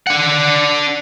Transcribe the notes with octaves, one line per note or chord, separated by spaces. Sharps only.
D4 F#5